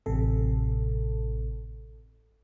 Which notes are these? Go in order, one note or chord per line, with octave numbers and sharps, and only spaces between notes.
A1 C3 A4